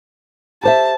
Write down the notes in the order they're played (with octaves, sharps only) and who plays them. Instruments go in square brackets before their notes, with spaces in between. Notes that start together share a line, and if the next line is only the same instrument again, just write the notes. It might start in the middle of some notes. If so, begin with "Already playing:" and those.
[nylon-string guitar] G4 C5 E5 [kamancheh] A5